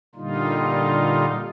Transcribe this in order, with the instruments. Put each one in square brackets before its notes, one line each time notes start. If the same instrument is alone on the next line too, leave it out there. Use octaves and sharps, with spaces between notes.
[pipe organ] A#2 D3 G3 D#4 F4